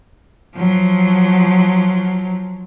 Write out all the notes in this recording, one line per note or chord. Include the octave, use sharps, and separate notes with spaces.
F3 F#3